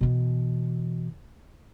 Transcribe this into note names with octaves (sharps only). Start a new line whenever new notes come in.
B2 E3